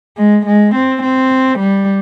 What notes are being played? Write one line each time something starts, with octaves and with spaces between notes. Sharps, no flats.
G#3
G#3
C4
C4
G3